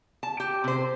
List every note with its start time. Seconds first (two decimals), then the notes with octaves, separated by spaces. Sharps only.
0.23 A5
0.40 G4
0.64 C3 C5